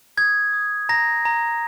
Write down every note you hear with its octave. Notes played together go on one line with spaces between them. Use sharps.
D#6 G#6
D#6
A#5 A#6
A#5